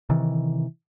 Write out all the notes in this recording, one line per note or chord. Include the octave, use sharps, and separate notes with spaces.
C3 D#3 E3